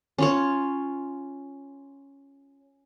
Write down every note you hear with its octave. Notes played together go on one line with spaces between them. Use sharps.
C#4 F4 C#5